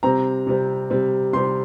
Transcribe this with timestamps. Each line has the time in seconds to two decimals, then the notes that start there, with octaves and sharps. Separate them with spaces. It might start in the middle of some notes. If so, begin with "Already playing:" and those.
0.03 C3 G3 C4 A#5
0.47 C3 G3 C4
0.90 C3 G3 C4
1.33 C3 G3 C4 C6